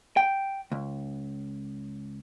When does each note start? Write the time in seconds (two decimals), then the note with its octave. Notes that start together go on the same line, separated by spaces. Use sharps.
0.17 G5
0.72 C#2